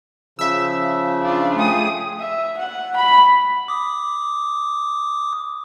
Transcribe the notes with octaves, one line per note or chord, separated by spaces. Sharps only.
C#3 F3 E5 E6
D4 F4
A3 G#4 G5 D#6
E5
F#5
B5
D6 D#6